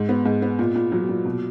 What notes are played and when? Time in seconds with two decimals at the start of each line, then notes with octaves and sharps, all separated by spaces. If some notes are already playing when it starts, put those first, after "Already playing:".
Already playing: G#2
0.09 B3
0.26 G#2
0.42 B3
0.59 A#2
0.76 A#2
0.92 F#3
1.09 A#2
1.25 B2